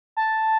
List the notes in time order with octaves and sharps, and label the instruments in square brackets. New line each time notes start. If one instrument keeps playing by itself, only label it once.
[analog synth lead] A5